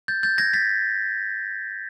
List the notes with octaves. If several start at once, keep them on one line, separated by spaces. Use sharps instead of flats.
G6 A6
G6 A6
G#6 A#6
A6 B6